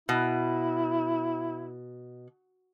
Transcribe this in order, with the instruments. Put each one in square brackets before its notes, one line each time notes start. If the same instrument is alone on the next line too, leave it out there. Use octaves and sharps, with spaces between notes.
[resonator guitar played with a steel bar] B2 [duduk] E4